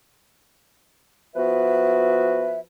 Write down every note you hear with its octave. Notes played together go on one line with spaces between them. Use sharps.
F3 B3 F#4 B4 E5